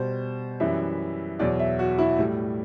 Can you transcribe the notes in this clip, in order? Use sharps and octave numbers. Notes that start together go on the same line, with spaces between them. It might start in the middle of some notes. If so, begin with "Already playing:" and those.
Already playing: B2 G3 C5
F#2 E3 G3 E5
E2 B2 F#3 D5
E5
F#4
E4
A2 G3